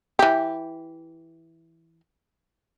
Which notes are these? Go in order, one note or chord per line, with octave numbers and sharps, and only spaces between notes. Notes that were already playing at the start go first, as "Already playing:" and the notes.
E3 G4